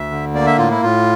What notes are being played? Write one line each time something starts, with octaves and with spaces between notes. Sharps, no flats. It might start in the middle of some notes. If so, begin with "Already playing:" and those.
Already playing: D2 E5
D3
A#3 D5
E5
A2 F4
E4
A2 F4